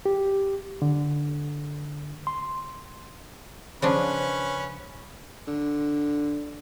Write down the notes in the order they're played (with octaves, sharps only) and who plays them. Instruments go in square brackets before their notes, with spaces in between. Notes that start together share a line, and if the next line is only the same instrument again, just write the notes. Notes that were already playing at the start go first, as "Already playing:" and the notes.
[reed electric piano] G4
D3
C6
[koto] C#3 F3 D4 [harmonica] C#4 B4
[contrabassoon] D3